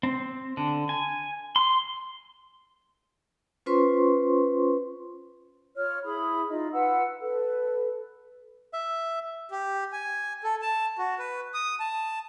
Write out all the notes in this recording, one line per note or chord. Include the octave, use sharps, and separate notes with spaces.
C4
D3
G#5
C6
C#4 F4 B4 C5 C6 C#6
F4 C#5 F6
E4 G#4 B5 D#6
D#4 F4 D#5
F4 B4 F#5 E6
A4 B4
E5
G4
G#5
A4
A5
F#4
B4
D#6
A5